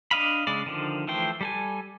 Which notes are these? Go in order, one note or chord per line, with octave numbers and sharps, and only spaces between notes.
D4 D#5 F5 B5
C#3 G#3 D5
D3 D#3 F3
E3 F3 A3 C5 G5
G3 A4 G#5